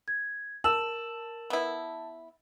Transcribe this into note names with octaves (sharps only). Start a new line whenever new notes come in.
G#6
A#4 A5 E6 E7 F#7
B3 E4